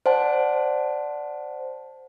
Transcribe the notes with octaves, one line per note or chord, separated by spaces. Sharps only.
C5 D5 F#5 A5